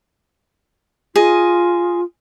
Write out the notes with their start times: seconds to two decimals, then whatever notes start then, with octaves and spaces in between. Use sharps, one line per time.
1.16 F4 G#4 D#5